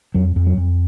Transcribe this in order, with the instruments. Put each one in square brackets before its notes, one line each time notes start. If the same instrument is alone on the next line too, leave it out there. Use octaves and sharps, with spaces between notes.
[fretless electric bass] F2 F#3
F2
F#3
F2